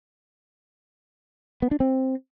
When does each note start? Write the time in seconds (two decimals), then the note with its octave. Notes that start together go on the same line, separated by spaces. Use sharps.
1.62 B3
1.71 D4
1.80 C4